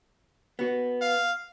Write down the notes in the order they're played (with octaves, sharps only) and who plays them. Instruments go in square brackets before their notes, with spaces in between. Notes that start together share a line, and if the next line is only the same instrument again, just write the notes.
[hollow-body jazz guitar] B3 F#4
[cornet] F5